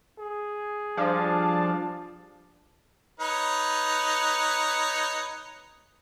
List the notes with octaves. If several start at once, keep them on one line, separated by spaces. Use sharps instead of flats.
G#4
F3 G3 D4 D5 F5 A5
D#4 B4 C#5